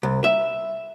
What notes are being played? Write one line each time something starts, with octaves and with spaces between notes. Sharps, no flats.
C2
E5